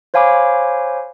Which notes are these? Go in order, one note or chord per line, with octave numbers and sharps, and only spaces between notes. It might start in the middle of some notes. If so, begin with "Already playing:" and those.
C5 C#5 F5 G#5 B5 D6